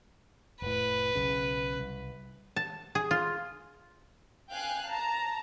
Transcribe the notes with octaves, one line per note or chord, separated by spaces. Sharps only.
F1 A2 B4
B1 C#3
C2
A5
G#4
F4
F5 G5 G#5 F#6
A5 A#5